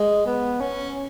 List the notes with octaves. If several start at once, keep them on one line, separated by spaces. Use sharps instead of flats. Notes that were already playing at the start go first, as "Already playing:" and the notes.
Already playing: G#3
B3
C#4